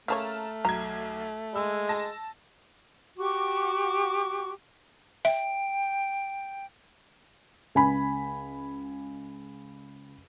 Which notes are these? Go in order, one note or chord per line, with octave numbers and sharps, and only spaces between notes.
C#3 A3 A#3 C#5 A5 A#5 F6
B1 A#5 G#6
G#3 E6
A5 A#6
F#4 G4 C#6 D6
E5 G5
C#2 G#5 B5